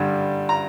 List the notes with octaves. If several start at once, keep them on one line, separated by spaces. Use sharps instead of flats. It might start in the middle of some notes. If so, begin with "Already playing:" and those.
Already playing: G2 D3 G3
A#5